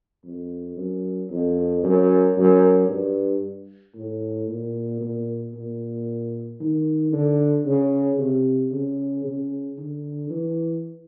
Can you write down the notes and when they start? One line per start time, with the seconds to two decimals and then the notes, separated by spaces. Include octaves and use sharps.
0.25 F2
0.77 F#2
1.30 F2
1.83 F#2
2.37 F#2
2.89 G2
3.95 A2
4.48 A#2
5.01 A#2
5.54 A#2
6.60 D#3
7.13 D3
7.66 C#3
8.19 C3
8.72 C#3
9.24 C#3
9.78 D3
10.30 E3